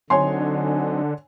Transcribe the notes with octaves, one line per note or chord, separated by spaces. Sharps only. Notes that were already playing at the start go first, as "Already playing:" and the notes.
D3 F#3 C4 D#4 C#5 G#5 C6